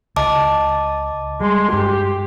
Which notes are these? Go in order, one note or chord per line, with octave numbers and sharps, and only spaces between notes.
C#2 D#5 A5 D6
G3 G#3 C6
G2 G#3 G4